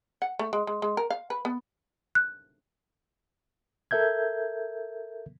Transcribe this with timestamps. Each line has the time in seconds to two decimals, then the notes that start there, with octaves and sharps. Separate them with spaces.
0.22 F#5
0.39 A3
0.53 G#3
0.67 G#3
0.82 G#3
0.97 A#4
1.10 F5
1.30 B4
1.45 B3
2.15 F#6
3.91 A4 A#4 E5 G6 G#6